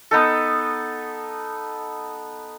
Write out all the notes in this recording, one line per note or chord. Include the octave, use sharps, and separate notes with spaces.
B3 D#4 A4